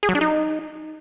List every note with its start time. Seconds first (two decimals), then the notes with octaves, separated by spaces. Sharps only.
0.03 G#4
0.09 F#3
0.15 D4
0.21 D#4